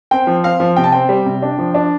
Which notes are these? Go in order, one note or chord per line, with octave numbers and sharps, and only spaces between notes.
C4 G5
F3
C4 F5
F3
C3 G5
A5
C4 G5
G3
C3
D4
F3
D4